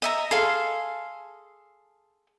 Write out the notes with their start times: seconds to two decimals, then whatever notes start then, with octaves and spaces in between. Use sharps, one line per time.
0.02 D#5 E5 A#5
0.31 G#4 A4 F5 C6